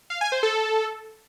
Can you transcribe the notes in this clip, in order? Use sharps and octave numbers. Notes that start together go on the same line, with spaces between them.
F5
G#5
C5
A4